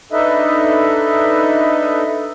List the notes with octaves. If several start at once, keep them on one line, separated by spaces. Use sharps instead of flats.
D4 D#4 A4 B4 D#5 E5